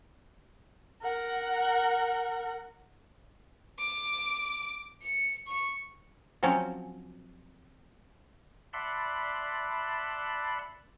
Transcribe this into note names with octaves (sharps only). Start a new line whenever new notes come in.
A#4 F#5
D6
C#7
C#6
F3 F#3 C4 C#4
D5 E5 F#5 A5 B5 C6